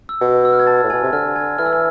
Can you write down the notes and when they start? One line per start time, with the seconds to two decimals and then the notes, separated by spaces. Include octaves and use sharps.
0.09 E6
0.21 B2
0.45 E6
0.53 F6
0.60 G#6
0.67 A5 A6
0.83 A2
0.90 B2 G#5 G#6
1.03 C3
1.13 D3 F6
1.36 G#5 G#6
1.58 E3 F6
1.66 E6
1.73 F6